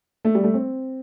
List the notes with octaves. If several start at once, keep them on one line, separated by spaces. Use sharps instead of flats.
A3
G3
A3
C4